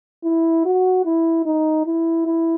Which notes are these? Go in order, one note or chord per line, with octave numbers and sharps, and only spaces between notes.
E4
F#4
E4
D#4
E4
E4